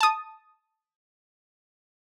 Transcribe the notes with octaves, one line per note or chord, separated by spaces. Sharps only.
A5 D#6